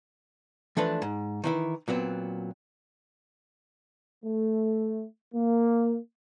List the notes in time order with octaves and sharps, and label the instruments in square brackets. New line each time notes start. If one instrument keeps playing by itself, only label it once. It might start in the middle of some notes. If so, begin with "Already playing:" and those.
[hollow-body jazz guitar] E3 F3 A3 D4 A4 B4
G#2
D#3 E3 E4
A#2 F#3 B3 C4
[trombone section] A3
A#3